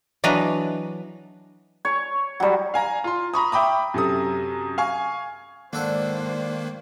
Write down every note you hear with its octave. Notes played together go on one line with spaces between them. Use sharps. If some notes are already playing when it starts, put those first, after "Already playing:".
E3 F#3 D4 B4 D#5 A#5
C#5
F#3 G3
F5 G#5 A#5
F4 C6
A#5 B5 C#6 D#6
E5 G5 B5 D6 D#6
F#2 C3 A4 D#6
F5 G#5 C#6
G#2 D#3 A#3 D4 A4 C5 F#5